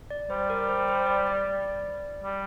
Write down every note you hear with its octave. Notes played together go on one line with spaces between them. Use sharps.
D5
G3 C5
A#4
C5
C5
D5
D5
G3